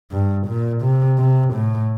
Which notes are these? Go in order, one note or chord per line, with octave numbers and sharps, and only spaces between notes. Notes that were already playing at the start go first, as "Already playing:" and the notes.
G2
A#2
C3
C3
A2